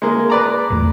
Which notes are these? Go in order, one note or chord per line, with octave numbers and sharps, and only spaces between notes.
G#3 A#3
B4 D5 A#5
G1 E2 A3